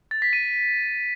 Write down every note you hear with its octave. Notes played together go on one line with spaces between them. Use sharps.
A6
B6
D#7